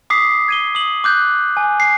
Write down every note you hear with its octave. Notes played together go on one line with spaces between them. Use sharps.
D6 D#6 B6 C7
G#6 D#7 G7
D#6 F#7
D6 F#6 G6
G#5
C7